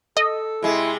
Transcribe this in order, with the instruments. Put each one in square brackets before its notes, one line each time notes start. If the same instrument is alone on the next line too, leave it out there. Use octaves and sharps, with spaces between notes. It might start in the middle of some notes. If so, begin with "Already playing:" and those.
[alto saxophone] A4 [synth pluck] D#5
[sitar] C3 G#3 [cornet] E4